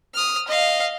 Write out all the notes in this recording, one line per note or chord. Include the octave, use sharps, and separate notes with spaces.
D#6 F6
D#5 F5